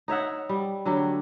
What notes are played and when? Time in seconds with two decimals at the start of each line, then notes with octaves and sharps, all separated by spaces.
0.08 D#4 C#5 E5 F#5
0.49 G3
0.86 D3 F#3 A3 G4